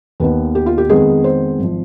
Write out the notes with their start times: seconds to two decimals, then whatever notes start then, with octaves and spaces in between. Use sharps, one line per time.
0.20 D#2 D#3 B3 B4
0.55 G4
0.66 F4
0.78 G4
0.89 F2 D#3 G#3 B3 G#4
1.24 C5
1.59 G#1 F3